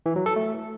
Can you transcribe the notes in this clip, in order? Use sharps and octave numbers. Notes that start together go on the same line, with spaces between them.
E3
F#3
A4
A3